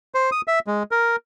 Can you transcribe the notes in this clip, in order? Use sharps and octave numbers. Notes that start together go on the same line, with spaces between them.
C5
D#6
E5
G#3
A#4